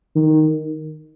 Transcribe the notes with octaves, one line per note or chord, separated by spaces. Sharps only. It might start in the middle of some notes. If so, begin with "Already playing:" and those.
D#3